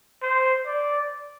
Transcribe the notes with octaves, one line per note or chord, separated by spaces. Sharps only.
C5
D5